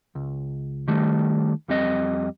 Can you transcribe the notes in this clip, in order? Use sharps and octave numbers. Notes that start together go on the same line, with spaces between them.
C#2
D#3 G3 A3
F2 G3 C4 D#5